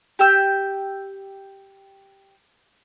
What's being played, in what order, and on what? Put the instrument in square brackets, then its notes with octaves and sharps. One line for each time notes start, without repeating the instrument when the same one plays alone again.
[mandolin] G4 G5 E6